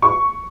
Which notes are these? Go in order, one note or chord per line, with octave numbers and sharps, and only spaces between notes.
C#6